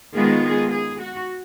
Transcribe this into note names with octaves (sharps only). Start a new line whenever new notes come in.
D#3 G#3 B3 F4 G#4
G#4
G#4
F#4